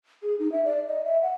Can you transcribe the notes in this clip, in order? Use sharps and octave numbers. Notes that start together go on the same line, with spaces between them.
G#4
D#4
E5
D5
D#5
E5
F#5